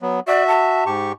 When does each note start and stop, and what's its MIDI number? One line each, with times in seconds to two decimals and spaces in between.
0.02 0.20 54
0.02 0.20 59
0.28 0.84 66
0.28 0.45 74
0.28 0.84 76
0.47 0.89 81
0.86 1.12 44
0.86 1.12 67
0.86 1.12 85